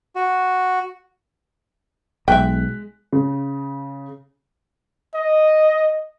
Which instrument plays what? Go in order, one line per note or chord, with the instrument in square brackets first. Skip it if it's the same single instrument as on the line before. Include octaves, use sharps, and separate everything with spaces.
[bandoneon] F#4
[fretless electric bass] B1 [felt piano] G#3 F#6 B6 [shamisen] E5 G5
[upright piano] C#3
[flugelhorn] D#5